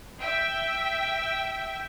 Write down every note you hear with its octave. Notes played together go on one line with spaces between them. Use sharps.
E5 G5